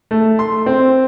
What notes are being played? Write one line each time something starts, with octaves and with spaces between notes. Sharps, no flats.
A3
C6
C4